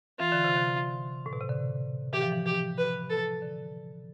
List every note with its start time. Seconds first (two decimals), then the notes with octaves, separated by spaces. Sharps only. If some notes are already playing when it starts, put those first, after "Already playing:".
0.19 E3 F4
0.32 D3
0.44 C3
0.57 D3
1.26 A2
1.33 B2
1.41 C3
1.49 D3
2.13 E3 G4
2.22 F3
2.32 E3
2.46 G4
2.78 B4
3.10 A4
3.42 D3